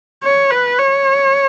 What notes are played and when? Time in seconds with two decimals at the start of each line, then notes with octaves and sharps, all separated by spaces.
0.23 C#5
0.51 B4
0.79 C#5